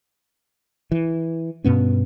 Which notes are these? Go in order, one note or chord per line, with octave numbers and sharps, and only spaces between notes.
E3
G2 B2 B3 C#4